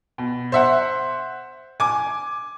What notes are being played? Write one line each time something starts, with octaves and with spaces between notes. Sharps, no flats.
B2
C5 E5 F#5
G#5 D6